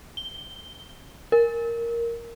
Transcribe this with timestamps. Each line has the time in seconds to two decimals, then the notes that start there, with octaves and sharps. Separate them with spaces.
0.17 G7
1.32 A#4